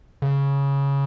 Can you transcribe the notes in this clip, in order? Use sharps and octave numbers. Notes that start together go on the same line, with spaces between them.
C#3